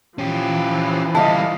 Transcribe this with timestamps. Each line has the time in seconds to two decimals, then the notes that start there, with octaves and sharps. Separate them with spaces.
0.18 E3 F3 C#4 G4
1.15 G3 E4 D#5 F5 A5